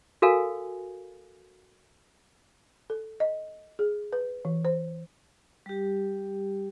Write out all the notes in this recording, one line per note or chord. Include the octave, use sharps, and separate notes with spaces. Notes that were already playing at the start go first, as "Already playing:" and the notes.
F#4 A4 A#4 F5 G#5
A4
D#5
G#4
B4
E3
C5
G3 G4